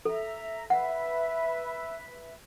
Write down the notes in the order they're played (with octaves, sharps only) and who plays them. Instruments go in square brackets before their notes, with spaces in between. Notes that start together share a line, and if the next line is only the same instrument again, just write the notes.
[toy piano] A4 [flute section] E5 A#5
[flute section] B4 E5 [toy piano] F#5